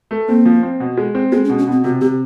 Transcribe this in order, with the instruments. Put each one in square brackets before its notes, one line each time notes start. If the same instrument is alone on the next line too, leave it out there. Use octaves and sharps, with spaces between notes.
[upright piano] A3
[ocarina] A#3 [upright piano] C4
[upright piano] F3
C4
B2
G#3
C4
[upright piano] G#3 [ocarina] B3
[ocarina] C#4
[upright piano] B2
[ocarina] C#4
[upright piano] B2 [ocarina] C4
[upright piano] C3 [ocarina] F#4
[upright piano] C3 [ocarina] G4